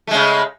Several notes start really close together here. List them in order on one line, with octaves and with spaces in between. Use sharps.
A3 G#3 C#3